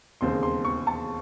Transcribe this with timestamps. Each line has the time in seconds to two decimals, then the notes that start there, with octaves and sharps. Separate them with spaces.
0.21 E1 D#2 C#3 G#3 C4 C6
0.43 C6
0.65 C#6
0.87 A5